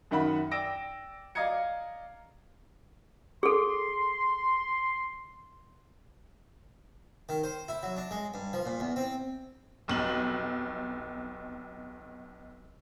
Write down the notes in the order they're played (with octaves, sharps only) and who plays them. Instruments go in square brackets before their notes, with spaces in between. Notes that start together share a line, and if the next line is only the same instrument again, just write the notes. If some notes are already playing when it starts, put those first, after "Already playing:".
[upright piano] F#2 D#3 E5 F#5 B5
D5 G5 E6 A#6 D7
D5 D#5 F5 A#5 G#6 C#7
[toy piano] G#4 A4 [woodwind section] C6
[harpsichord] D#3
C5
E4
F#3
D4
G#3
G2
F3
A#2
E2
C4
[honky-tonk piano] F1 B1 F#7